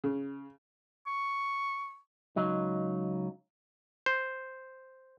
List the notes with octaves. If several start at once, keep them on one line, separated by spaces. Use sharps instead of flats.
C#3
C#6
C#2 F#3 D#4
C5